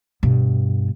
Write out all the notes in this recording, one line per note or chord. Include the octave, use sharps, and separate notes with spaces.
G2 B2